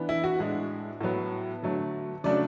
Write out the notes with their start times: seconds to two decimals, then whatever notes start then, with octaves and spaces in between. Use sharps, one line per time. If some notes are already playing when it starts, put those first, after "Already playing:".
Already playing: E3 B3 D4
0.09 E4
0.24 F#4
0.39 A2 G#3 D4
1.01 A2 F#3 B3
1.63 D3 F#3 A3
2.24 C#3 F#3 A3 D4 D5